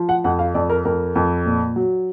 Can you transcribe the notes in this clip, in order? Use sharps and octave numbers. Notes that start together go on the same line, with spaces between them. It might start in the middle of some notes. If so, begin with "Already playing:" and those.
Already playing: F3
F#5
F2 F#5
F5
F2 D5
A#4
F2 A#4
F2
A#2
F#3